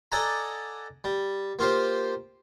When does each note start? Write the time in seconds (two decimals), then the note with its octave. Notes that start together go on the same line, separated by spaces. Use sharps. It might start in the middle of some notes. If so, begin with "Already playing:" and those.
0.12 A4 D5 D#5 F#5 G#5 A#5
1.04 G3
1.59 A#3 F4 G4 C5